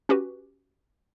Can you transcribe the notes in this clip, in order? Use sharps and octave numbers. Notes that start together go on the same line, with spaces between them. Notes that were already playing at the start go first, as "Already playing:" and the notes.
C#4 F#4 G4 B4